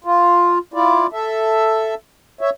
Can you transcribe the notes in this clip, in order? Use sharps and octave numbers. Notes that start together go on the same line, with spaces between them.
F4
E4 F4 D5
A4 E5
C#5 E5